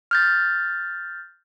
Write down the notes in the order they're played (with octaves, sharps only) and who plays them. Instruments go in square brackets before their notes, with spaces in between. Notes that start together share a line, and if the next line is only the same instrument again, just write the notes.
[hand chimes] F6 G6 A6